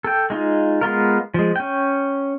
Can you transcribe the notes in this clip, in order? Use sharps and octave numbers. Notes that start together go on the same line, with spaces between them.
A4 G5
G#3 D#4 F4
G#3 B3 F4 A#4
F3 G#3
C#4 G5